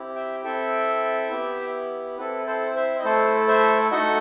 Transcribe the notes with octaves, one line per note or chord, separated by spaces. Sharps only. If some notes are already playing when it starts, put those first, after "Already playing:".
Already playing: C4 E4 G4
E5 G5
C4 E4 A4 E5 G5
B3 E4 G4
C4 E4 A4 B4
A4 C5
C5 E5
D#5
A3 E4 A4 C5
C5 E5
A3 D#4 F#4 A4 D#5 F#5